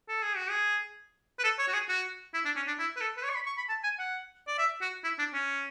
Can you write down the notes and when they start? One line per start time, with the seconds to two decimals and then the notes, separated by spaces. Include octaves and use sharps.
0.08 A4
0.22 G#4
0.36 F#4
0.50 G#4
1.39 B4
1.44 A4
1.59 C#5
1.68 F#4
1.73 G#4
1.89 F#4
2.34 E4
2.45 D4
2.56 C#4
2.67 D4
2.79 E4
2.97 B4
3.01 A4
3.17 B4
3.24 C#5
3.30 C#6
3.35 B5
3.46 C#6
3.57 B5
3.69 A5
3.84 G#5
3.99 F#5
4.47 D5
4.58 E5
4.81 F#4
5.04 E4
5.19 D4
5.33 C#4